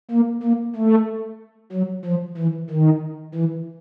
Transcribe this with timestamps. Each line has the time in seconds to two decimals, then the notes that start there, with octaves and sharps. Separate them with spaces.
0.11 A#3
0.43 A#3
0.76 A3
1.72 F#3
2.05 F3
2.37 E3
2.70 D#3
3.35 E3